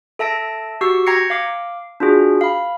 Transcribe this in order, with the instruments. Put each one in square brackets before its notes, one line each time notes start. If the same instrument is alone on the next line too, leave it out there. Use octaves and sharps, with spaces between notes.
[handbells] A4 E5 A5 A#6 D7
F#4 G4 C#6 E6 C7
G5 A#5 G#6 A#6 C7 C#7
F5 D6
D4 F4 F#4 G#4
F5 B5